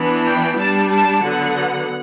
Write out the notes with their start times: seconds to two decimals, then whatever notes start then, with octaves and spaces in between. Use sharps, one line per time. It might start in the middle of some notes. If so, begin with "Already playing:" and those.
Already playing: E3 B3 D4
0.25 G5
0.57 G3 D4 A5
0.90 A5
1.22 D3 F#3 B3 F#5